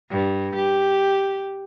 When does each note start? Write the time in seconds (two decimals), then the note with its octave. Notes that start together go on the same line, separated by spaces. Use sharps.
0.11 G2
0.55 G4